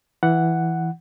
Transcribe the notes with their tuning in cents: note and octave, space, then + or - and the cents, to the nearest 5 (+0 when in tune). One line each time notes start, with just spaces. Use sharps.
E3 +0 F#5 +0